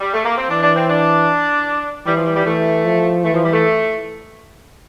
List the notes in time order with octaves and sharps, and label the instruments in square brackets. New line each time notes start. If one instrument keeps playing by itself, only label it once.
[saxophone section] G3
A3
A#3
C4
[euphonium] E3 [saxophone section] D4
[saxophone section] D4
C4
D4
[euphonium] E3 [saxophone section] G3
[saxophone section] F3
G3
G3
[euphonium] E3 [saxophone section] A3
[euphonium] F3
[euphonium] E3 [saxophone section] A3
[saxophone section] F3
G3
A3